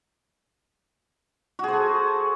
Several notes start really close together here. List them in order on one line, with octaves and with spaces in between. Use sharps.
F#4 G#4 C5 A4